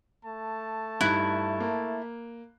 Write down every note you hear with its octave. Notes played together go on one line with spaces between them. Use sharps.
A3 A5
G2 D#4 E4 F#6
A#3